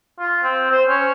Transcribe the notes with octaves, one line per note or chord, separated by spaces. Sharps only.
F4
C4
C5
C#4